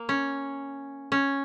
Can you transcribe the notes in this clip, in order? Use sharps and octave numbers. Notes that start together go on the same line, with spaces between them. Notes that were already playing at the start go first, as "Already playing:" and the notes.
Already playing: A#3
C#4
C#4